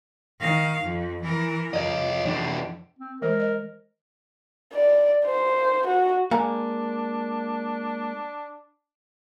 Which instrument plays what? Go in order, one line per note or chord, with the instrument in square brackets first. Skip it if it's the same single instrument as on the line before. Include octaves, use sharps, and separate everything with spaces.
[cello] D#3 F5
F2
E3 A#4
[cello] F2 [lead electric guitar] C#5 D#5
[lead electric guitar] E3 D4
[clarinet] C4
[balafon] E3 G#3 C5 [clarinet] A#4
[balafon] D#5
[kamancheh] D5
C5
F#4
[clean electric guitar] G#3 A#3 [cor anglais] D4 [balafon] F5 G#5 A#5